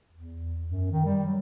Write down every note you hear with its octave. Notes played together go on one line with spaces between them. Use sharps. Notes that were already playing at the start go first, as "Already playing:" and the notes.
E2
F#2
D#3
G3
F#3